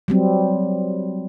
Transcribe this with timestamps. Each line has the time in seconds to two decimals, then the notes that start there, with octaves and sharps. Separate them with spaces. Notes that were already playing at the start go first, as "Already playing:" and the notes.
0.08 F#3 G3 C4